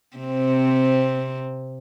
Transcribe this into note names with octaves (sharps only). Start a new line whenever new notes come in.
C3 C4